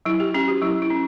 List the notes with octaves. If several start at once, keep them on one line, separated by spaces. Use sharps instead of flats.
F#3 E4
G4
C#4 G4
F#4
F#3 E4
E4
C#4